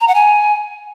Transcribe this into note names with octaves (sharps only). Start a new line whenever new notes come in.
A#5
F#5
G#5